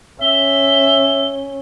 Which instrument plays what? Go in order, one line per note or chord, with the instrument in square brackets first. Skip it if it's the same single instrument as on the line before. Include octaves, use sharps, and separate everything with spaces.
[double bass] C#4 [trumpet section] E5 [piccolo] G7